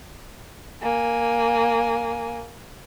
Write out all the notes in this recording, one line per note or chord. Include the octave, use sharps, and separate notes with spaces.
A#3 G#5